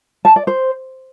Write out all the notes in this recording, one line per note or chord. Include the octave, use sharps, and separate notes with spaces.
A5
D5
C5